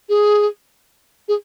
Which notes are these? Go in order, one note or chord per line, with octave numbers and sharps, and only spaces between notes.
G#4
G#4